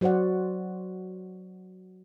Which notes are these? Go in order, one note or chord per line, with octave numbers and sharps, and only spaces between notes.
F#3 F#4 C5 D5 F#5